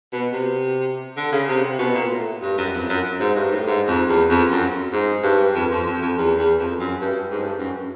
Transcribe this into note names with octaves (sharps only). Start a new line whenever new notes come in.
B2
C3
D3
C#3
C3
C3
B2
A#2
A2
G2
F#2
F2
F#2
G#2
G2
A2
G#2
F2
E2
F2
F#2
G#2
G2
F2
F2
F2
F2
E2
E2
F2
F#2
G2
G#2
G2
F#2